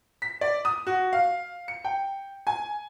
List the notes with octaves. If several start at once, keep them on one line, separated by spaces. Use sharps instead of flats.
B6
D5
D#6
F#4
F5
C#7
G5
G#5